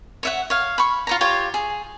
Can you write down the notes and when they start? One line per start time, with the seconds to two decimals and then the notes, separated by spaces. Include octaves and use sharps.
0.23 C#5 E5 F#5
0.50 C#5 F5
0.78 B5 C#6
1.07 F4 C#5 A#5
1.21 F4 G4 C#5
1.54 G#4